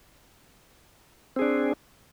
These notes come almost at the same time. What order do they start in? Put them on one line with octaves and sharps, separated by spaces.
C4 G#4 D4